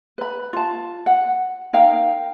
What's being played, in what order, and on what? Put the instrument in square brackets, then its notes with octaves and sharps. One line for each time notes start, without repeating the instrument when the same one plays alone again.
[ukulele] B4 B5
F4 A5
F#5
D#4 A#4 F5 G5